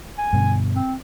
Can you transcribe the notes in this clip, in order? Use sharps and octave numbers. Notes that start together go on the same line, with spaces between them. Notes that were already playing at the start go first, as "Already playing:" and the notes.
G#5
G2 B2 D3
C4